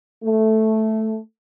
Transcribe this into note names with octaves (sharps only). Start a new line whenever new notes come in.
A3